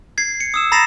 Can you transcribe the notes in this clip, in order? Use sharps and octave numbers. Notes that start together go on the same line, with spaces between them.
G#6 C7
C#7
D#6 E6 E7
A#5 B5 A6 A#6 C7 E7